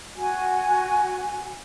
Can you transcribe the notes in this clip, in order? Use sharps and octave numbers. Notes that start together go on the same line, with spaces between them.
F#4 G#5